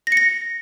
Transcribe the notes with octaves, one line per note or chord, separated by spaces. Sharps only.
A#6
C#7
A#6